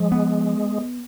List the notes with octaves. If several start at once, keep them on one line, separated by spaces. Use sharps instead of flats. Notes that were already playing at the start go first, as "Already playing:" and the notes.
Already playing: F3 G#3
B3